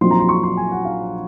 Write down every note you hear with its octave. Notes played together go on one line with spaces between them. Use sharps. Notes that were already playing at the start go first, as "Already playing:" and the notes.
A#1 A#2 F#3 C4 D#4 C6
A#5
C6
C#6
C6
G#5
F#5
F5